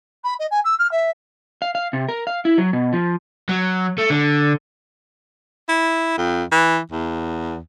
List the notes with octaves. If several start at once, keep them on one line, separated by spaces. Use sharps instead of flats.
B5
D#5
G#5
E6
F6
E5
F5
F5
C3
A#4
F5
E4
F#3
B2
F3
F#3
A3
D3
E4
F2
E3
E2